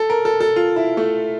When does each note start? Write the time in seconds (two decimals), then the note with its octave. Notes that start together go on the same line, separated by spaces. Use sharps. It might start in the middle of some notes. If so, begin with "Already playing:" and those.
Already playing: A4
0.10 A#4
0.25 A4
0.40 A4
0.56 F4
0.76 E4
0.97 A3